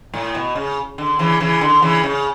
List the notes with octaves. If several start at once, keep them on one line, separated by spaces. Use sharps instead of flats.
A2
B2
C#3
D3
C#3 E3
C#3 E3
D3
C#3 E3
C#3